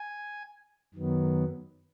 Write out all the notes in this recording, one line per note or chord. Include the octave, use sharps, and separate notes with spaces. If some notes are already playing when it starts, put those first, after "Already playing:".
Already playing: G#5
F#2 D#3 F#3 B3